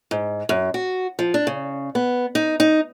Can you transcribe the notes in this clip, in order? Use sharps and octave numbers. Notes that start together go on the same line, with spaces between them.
G#2
F#2
F#4
F3
D4
C#3
B3
D#4
D#4